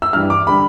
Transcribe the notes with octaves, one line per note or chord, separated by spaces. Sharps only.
E6
G2 E3 G3 F6
D6
D3 G3 B5